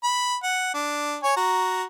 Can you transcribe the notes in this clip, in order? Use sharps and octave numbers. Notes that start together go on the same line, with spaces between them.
B5
F#5
D4
C#5 G#5
F#4 A#5